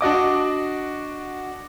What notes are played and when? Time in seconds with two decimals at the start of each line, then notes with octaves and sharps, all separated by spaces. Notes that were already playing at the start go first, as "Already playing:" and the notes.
0.01 D4 F#4 D#5 D6